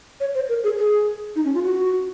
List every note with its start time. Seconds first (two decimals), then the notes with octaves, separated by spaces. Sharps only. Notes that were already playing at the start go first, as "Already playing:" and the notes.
0.20 C#5
0.35 C5
0.49 A#4
0.64 G#4
0.78 G#4
1.36 D#4
1.45 C#4
1.54 F4
1.63 F#4